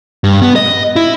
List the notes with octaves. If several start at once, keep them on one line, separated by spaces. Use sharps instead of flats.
G2
B3
D#5
E4